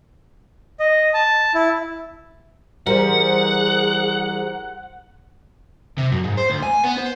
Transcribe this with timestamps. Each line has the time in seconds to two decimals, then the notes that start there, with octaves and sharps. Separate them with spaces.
0.80 D#5
1.14 A5
1.54 E4
2.87 E3 G3 G#4 A#4 C5 F#5
5.98 C3
6.12 F#2
6.24 G#2
6.38 C5
6.50 D2
6.63 G#5
6.84 B3
6.99 C5